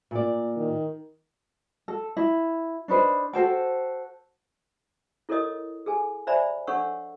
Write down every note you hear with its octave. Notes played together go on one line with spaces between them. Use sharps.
A#2 D5
D#3
A4
E4
D4 D#4 B4 C5
F#4 A4 C5 G5
E4 A4 A#4 C#5 D#5 D#6
G#4 A4 G#5
C5 D5 E5 G#5 A#5 B5
D4 A4 C#5 F#5 C#6 E6